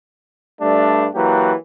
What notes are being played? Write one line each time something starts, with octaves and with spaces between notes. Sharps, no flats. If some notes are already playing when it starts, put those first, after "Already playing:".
G2 G3 A3 D4
E3 F#3 A#3 G4